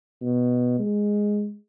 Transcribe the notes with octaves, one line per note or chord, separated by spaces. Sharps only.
B2
G#3